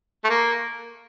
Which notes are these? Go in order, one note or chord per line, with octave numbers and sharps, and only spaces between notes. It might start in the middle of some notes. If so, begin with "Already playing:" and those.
A3
A#3